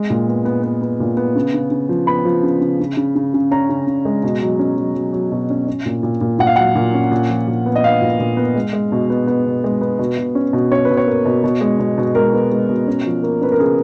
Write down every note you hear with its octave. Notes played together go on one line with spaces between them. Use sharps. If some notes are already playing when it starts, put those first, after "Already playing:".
Already playing: G#3
A#2
B3
B3
B3
B3
A#2
B3
C#3
C#3
C#3
F3
B3 B5
F3
C#3
C#3
C#3
C#3
C#3
C#3
C#4 A#5
C#3
C#3
G#3
B2
F#3
C#4
F#3
F#3
F#3
B2
C#4
C#4
A#2
A#2
A#2
A#2 F#5
F5
F#3 F#5
A#2
C#4
A#2
F3
A#2
B3
D#5
B3 F5
A#2
A#2
B3
G#3
G#3
B2
B3
B3
B2
G#3
B3
B2
B2
C#4
B2
C#4 C#5
B4
B2
C#5
A#3
B2
B2
G#3
B2
B2
G#3 A#4
B3
G#3
B2
C#4
F3
A#3
C#4 B4
A#4
C#3 G#4